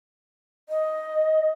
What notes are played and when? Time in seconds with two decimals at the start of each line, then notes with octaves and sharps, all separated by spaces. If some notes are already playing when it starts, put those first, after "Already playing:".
0.69 D#5